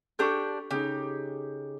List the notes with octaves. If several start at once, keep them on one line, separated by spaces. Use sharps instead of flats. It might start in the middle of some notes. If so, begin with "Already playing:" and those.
D4 G4 A4 C#6 G6
C#3 D#4 G4